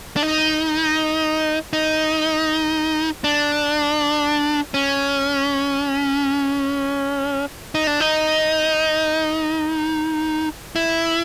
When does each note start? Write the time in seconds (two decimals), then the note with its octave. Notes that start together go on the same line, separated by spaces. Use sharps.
0.16 D4
0.23 D#4
1.73 D#4
3.24 D4
4.74 C#4
7.75 D#4
7.87 D4
8.00 D#4
10.76 E4